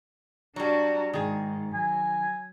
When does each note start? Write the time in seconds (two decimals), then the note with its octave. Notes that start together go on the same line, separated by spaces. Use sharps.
0.56 F#3 G3 D4 F#4
1.13 G#2 D#3 G#4
1.74 F#3 G#5